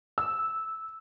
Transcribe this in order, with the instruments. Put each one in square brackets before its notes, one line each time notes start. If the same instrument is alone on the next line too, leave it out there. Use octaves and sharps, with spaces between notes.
[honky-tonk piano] E6